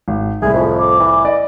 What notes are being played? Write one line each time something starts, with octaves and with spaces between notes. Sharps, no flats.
G#1
C2 A2 G#4 E5
F2
D6
E3
D5 D#5